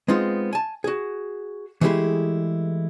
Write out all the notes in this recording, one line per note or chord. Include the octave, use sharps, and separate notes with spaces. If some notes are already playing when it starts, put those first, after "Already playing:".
G#3 B3 C4 D#4 F4
G#5 A5
F#4 G#4
E3 G#3 A3 E4 G4 G#4